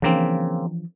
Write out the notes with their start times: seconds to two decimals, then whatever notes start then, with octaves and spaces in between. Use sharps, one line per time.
0.02 C#3 E3 F3 A#3 C4 D4